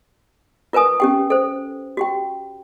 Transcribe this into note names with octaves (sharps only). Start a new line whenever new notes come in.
F4 A#4 B4 G#5 D#6
C#4 G4 G5
A4 C5
F#4 G4 G5